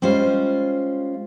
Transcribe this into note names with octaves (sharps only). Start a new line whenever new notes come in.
G3 G#3 C#4 F4 C5